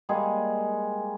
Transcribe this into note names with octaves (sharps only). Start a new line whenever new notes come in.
G3 G#3 A#3 G#4